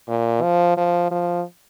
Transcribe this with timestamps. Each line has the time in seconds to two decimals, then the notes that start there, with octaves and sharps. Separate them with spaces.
0.08 A#2
0.42 F3
0.77 F3
1.11 F3